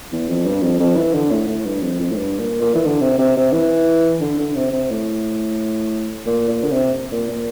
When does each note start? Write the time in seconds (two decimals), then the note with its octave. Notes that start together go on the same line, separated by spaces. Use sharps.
0.12 E2
0.28 F2
0.46 G2
0.62 F2
0.79 F2
0.96 E3
1.13 D3
1.31 A2
1.48 A2
1.66 G2
1.82 F2
2.00 F2
2.11 A2
2.17 G2
2.39 A#2
2.61 A#2
2.75 E3
2.85 D3
3.01 C3
3.18 C3
3.36 C3
3.52 E3
4.21 D3
4.39 D3
4.56 C3
4.72 C3
4.90 A2
6.26 A#2
6.48 A#2
6.63 D3
6.71 C3
7.12 A#2
7.29 A#2